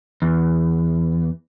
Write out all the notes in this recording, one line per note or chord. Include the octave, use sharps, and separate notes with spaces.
E2